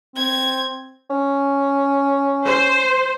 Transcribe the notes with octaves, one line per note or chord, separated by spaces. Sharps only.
C4 G#6
C#4
C5